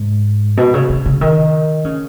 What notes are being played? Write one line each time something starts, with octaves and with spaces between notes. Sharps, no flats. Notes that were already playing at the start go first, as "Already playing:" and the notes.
Already playing: G#2
B2
C#3
C#3
C#3
D#3
C#3